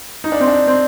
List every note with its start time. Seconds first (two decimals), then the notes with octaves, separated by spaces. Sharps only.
0.24 D#4
0.32 D4
0.40 C4
0.48 D4
0.67 C4